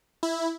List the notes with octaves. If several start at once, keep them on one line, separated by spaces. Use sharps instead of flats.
E4